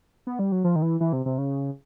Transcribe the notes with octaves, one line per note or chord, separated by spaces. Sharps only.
B3
G3
F#3
F3
D#3
E3
E3
C3
C3
C#3